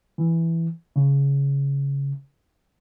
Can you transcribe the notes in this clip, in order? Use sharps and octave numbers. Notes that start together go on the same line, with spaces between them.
E3
C#3